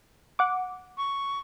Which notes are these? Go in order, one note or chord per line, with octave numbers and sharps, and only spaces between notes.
F#5 D6
C#6